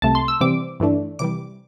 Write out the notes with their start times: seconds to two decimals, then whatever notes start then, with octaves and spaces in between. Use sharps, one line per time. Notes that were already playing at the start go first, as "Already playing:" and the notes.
0.02 C2 C3 A3 A5
0.15 C6
0.28 E6
0.41 C3 E3 G3 C4 D6
0.80 G2 E3 A3 D4
1.19 C3 E3 G3 D6